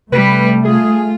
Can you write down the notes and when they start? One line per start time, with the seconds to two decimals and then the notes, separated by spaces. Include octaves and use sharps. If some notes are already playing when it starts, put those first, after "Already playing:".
0.12 C3 G3 A3 B4
0.65 F4 G#4